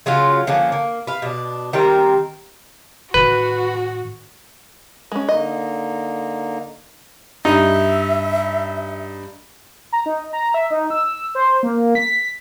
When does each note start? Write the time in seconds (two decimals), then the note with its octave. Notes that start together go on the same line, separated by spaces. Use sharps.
0.06 C#3 F#3 C#4 F4
0.47 D3 F3 A#3 C#4
0.72 A#3
1.07 B4 F5
1.22 B2 D4
1.73 D#3 G3 C4 A#4
3.14 A2 D#3 F#4 B4
5.12 G#3 C#4
5.29 D3 A#3 D#4 D#5
7.45 G2 D#4 E5
9.93 A#5
10.06 D#4
10.33 A#5
10.54 E5
10.71 D#4
10.90 E6
11.35 C5
11.63 A#3
11.95 B6